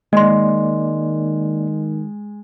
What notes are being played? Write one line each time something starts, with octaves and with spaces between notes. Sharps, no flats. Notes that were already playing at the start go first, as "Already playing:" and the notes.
D#3 G#3 A#3 D5 D#5 C6